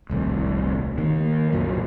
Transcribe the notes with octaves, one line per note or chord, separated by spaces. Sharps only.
D#1 C2 A2
D#3 A#3
C2 F#2 A#2 F#3